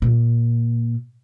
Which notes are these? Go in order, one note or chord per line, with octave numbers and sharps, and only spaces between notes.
A#2